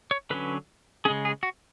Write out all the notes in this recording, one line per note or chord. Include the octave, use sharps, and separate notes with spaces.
C#5
D3 F#3 C#4 B4
C#3 G#3 C#4 G#4
G#4
F#4